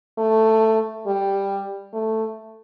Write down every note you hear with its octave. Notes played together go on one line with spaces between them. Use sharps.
A3
G3
A3